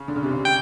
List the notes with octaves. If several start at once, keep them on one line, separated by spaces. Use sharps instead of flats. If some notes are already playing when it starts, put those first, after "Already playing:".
Already playing: C#3
D3
C#3
C3
C#3
G5